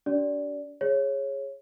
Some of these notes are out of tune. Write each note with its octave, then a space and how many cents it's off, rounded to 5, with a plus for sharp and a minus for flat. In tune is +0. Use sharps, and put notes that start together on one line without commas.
D4 -35 G4 -40 D5 -15
G#4 +0 C#5 -15